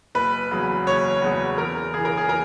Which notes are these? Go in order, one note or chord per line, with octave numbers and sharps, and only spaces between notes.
F#1 B4
E2 C#3 F#3
F#1 C#5
E2 C#3 F#3
E2 A#4
C#3 E3 G#4
A#4
G#4
A#4